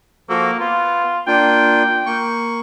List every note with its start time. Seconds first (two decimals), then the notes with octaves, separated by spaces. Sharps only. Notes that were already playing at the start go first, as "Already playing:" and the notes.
0.29 F3 A#3 F#4 A4
0.59 B3 F4
1.27 A#3 D4 F4 G5
2.06 A#3 C#6